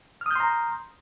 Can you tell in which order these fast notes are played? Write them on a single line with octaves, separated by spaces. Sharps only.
F6 D#6 G6 C6 A#5